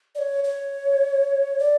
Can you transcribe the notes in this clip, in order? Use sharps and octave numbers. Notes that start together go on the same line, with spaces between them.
D5
C#5
C#5
D5